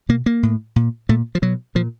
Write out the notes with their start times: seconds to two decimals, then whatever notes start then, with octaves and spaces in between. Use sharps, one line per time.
0.09 B2 A#3
0.26 A#3
0.43 A2
0.76 A#2
1.09 A#2 A3
1.35 F3
1.42 B2 F#3
1.75 A#2 F3